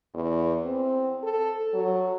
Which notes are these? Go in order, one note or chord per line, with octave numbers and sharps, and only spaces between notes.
E2
C4
A4
F#3